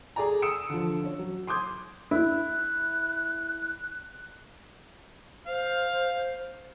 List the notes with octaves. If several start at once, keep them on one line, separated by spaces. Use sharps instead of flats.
G#4 A4 D5 G#5 A#5
D#6 E6 C#7 D7 E7
D3 F3
C#4
F#3
C6 D6 D#6 G6 G#6
E4 F#6
C5 F5